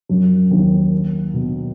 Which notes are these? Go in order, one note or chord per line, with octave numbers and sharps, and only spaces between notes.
F#2 F#3
D#2 D#3
B2